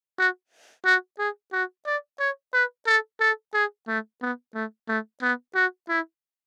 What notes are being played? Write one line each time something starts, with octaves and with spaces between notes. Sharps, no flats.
F#4
F#4
G#4
F#4
D5
C#5
B4
A4
A4
G#4
A3
B3
A3
A3
B3
F#4
E4